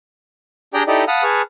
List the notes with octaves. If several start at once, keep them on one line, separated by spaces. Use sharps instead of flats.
D4 G4 G#4 D5 G5 A#5
D#4 E4 G4 A4 D5 D#5
F5 F#5 A5 B5 D#6 F6
G#4 B4 A5 C#6 F6